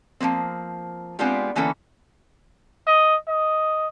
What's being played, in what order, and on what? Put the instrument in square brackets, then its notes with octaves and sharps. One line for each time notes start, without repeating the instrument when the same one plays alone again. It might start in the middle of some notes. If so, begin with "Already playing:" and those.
[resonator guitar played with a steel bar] F3 F#3 A#3 C4
G#3 B3 C4 D4 F4 G4
D3 E3 A#3 B3 C#4 A4
[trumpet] D#5
D#5